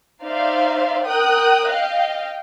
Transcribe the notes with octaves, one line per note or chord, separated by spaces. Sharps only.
D#4 C5 D5 E5 F5
A#4 G5 D#6 F#6
D#5 F5 G5